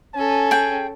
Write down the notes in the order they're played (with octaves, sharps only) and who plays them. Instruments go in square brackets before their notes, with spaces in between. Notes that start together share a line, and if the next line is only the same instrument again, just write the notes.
[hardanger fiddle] C#4 A4 [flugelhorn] G#5
[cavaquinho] G#4 G5